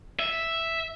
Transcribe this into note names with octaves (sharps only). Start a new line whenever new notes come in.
E5